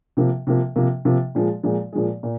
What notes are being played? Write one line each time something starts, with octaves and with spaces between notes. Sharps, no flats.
C3 F3 A#3
C3 F3 A#3
C3 F3 A#3
C3 F3 A#3
A#2 F3 G#3
A#2 F3 G#3
A#2 F3 G#3
A#2